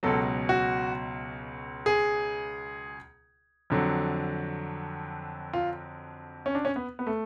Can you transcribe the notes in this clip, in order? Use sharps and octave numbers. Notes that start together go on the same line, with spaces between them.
C#2 B2 F#3 A4
F#4
G#4
F2 D3 F#3
F4
C#4
D4
C#4
B3
B3
A3